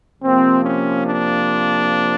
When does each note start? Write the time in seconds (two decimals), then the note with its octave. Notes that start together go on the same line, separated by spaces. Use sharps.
0.22 C3 F3 A#3 C4
0.63 C#4
1.05 D4